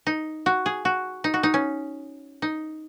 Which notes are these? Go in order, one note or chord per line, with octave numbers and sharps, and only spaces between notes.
D#4
F#4
G#4
F#4
D#4
F#4
D#4
C#4
D#4